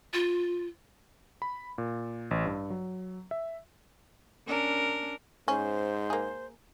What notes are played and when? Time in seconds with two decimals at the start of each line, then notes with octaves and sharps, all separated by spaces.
0.13 F4
1.42 B5
1.78 A#2
2.31 A1
2.45 G2
2.70 F#3
3.31 E5
4.47 C#4 D4 A#4
5.48 G#2 C#4 C5
6.10 A#3 G#4